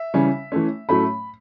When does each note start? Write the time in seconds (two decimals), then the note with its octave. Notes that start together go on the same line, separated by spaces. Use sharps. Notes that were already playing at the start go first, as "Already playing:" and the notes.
Already playing: E5
0.14 C#3 E3 G3 C#4
0.52 E3 A3 C#4
0.89 A2 F#3 A3 C#4 B5